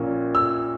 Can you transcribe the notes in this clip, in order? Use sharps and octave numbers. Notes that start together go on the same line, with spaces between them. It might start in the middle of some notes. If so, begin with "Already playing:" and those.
Already playing: A#1 A#2 A#3 C#4
E6